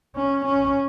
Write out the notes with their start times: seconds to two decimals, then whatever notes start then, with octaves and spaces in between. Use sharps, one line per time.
0.15 C#4
0.44 C#4